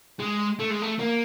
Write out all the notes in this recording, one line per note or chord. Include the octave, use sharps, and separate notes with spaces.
G#3
A3
G#3
A3
A#3